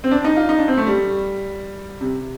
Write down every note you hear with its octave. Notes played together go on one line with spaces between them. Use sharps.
C4
D4
D#4
F4
D#4
D4
C4
A3
G3
C3